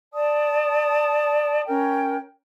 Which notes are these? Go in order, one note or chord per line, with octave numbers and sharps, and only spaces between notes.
D5 A5 D#6
C#4 A#4 G5